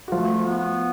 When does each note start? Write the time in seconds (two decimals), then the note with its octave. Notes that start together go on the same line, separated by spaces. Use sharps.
0.08 F#4
0.12 F3 A3 F4
0.45 B3